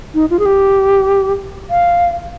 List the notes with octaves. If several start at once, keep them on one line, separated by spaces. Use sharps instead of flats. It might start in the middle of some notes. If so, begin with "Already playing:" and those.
D#4
F4
G#4
G4
F5